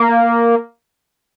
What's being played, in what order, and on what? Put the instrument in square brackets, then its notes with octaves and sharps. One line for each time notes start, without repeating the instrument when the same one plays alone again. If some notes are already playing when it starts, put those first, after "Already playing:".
Already playing: [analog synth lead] A#3